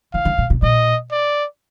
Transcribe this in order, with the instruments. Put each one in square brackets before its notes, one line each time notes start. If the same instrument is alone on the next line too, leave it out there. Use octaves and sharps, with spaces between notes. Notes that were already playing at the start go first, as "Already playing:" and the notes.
[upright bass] D#3 [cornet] F5
[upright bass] D3
A#2
B2
[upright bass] A#2 [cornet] D#5
[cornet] D5